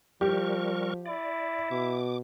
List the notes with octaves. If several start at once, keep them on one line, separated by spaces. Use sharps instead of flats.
F3 G3 G4 A#4 C#6
E4 D5
B2 D6